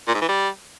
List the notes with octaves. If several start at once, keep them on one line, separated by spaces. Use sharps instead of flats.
A#2
G#2
E3
G3